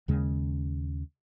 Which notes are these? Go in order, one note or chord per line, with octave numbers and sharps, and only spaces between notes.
D#2 C#3 G#3